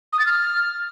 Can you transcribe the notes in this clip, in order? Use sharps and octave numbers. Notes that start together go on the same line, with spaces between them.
D#6
A6
F6